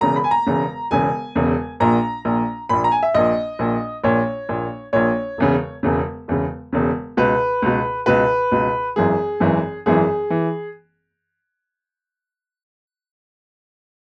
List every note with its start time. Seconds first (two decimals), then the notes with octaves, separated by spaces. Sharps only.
0.01 E1 E2 C#3 A#5
0.16 B5
0.24 G#5
0.31 A#5
0.46 E1 E2 C#3
0.91 E1 E2 C#3 G#5
1.36 E1 E2 C#3
1.80 A#1 A#2 A#5
2.25 A#1 A#2
2.69 A#1 A#2 B5
2.84 A#5
2.91 G#5
3.03 E5
3.15 A#1 A#2 D#5
3.59 A#1 A#2
4.04 A#1 A#2 C#5
4.49 A#1 A#2
4.93 A#1 A#2 C#5
5.38 E1 E2 C#3
5.83 E1 E2 C#3
6.28 E1 E2 C#3
6.73 E1 E2 C#3
7.17 C#2 B2 B4
7.62 C#2 B2
8.06 C#2 B2 B4
8.52 C#2 B2
8.96 G#1 F#2 E3 G#4
9.40 G#1 F#2 E3
9.86 G#1 F#2 E3 G#4
10.30 E3